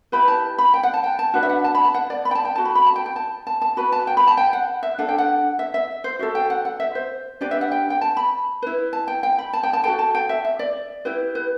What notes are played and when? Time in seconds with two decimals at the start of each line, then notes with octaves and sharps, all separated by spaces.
0.12 E4 G4 B4 B5
0.28 A5
0.58 B5
0.74 G5
0.83 F#5
0.94 A5
1.04 G5
1.19 A5
1.34 D4 F#4 B4
1.43 E5
1.49 F#5
1.64 A5
1.75 B5
1.85 A5
1.94 F#5
2.10 D5
2.25 B5
2.31 G5
2.35 A5
2.45 G5
2.55 F#4 A4 A5
2.65 B5
2.75 B5
2.86 A5
2.96 G5
3.06 G5
3.16 A5
3.47 A5
3.62 A5
3.77 F#4 B4 B5
3.92 A5
4.07 G5
4.17 B5
4.27 A5
4.37 G5
4.53 F#5
4.83 E5
4.98 D4 A4 F#5
5.09 G5
5.18 F#5
5.59 E5
5.74 E5
6.04 C5
6.19 F#4 A4 E5
6.35 G5
6.50 F#5
6.65 F#5
6.80 E5
6.95 C5
7.41 D4 G4 B4 D5
7.51 E5
7.61 F#5
7.72 G5
7.90 G5
8.01 A5
8.17 B5
8.62 E4 B4
8.93 A5
9.08 G5
9.23 G5
9.38 B5
9.53 A5
9.63 G5
9.73 A5
9.84 F#4 A4 G5
9.99 A5
10.15 G5
10.29 E5
10.45 E5
10.59 D5
11.05 E4 G4 B4
11.35 B4